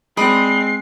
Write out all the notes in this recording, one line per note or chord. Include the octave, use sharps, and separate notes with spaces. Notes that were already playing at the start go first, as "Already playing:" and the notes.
G#3 C4 D5 D#5 B5 C7